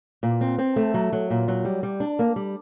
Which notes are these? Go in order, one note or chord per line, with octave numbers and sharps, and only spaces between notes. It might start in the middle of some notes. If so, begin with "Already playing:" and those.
A#2
C4
C4
A3
F#3
F#3
A#2
F#3
G3
G3
D4
A#3
G3